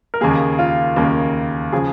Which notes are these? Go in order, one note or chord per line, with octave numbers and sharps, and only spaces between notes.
A#4
D#2 C#3 A#3 G#4
F4
D#2 C#3 A#3
C#3 F3 G#4